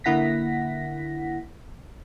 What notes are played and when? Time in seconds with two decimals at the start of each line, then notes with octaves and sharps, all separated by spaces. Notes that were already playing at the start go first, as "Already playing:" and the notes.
0.04 D3 A#3 E4 F#5 A#6 B6